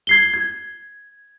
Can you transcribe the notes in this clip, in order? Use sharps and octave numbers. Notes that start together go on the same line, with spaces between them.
G#6 C7 G7
G#6